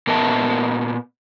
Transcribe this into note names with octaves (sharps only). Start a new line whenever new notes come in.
A#2 B3 A#4 D#5 E5 A5